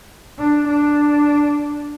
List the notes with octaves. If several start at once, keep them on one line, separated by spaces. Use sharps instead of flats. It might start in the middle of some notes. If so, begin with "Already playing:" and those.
D4
D4